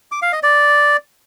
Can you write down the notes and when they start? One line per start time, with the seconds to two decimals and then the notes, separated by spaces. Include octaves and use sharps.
0.12 D6
0.22 F5
0.32 D#5
0.43 D5